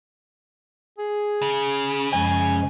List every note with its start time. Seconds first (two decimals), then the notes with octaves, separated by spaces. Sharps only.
0.98 G#4
1.42 C#3
2.13 F#2 F3 G#3 G#5